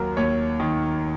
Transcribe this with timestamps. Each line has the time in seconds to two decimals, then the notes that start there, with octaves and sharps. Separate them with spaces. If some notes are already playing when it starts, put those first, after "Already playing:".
Already playing: D#2 F#3 A#4
0.17 D#2 C#5
0.60 D#3